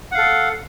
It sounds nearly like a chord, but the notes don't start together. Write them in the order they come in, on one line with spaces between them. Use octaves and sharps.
F#5 F5 A4